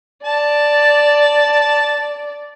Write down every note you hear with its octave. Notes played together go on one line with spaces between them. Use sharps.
D5 A5